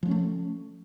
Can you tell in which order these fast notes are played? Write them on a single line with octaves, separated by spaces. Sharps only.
F3 G#3 C#4 A3